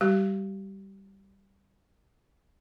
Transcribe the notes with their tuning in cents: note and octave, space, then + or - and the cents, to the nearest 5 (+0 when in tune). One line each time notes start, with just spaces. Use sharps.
G3 +0 G4 -30